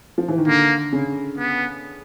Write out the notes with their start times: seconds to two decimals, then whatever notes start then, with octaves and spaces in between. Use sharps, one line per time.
0.18 F3
0.28 E3
0.38 D#3
0.47 D3 A#3
0.93 C#3
1.38 B3